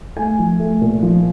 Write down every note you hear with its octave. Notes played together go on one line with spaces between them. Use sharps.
A3 G#5
F3
A3
A#2
F3